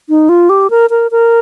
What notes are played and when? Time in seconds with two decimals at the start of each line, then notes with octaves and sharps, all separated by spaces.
0.09 D#4
0.29 F4
0.49 G4
0.70 A#4
0.90 A#4
1.11 A#4